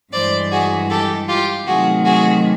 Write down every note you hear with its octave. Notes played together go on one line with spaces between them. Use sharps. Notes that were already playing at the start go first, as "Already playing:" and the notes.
G2 E3 G#3 C5 D5
F#4 G#4
G4 A4
F4 G4
C3 D#3 F#3 A3 F#4 G#4
F#4 G#4